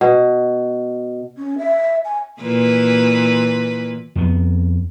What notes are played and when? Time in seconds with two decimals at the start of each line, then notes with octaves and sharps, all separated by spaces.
0.01 B2
1.38 C#4
1.58 E5
2.05 G#5
2.41 A#2 E3 B4
4.15 F2 B3